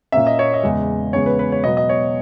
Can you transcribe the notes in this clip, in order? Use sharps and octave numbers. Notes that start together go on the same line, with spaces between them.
A#2 A#3 C#4 E5
D#5
C#5
D#5
E2 C#3 G#3
E2 C#3 G#3 B3 C#5
B4
B4
C#5
B2 F#3 B3 D#5
D#5
C#5